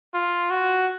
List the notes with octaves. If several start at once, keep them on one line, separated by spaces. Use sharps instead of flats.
F4
F#4